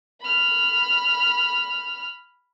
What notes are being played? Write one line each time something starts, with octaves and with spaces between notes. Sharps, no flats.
B5 F6